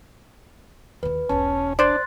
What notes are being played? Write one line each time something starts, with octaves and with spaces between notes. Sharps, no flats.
D#2 D3 B4
E1 B1 C#4 A5
D4 C5 D5 C6 F#6 A6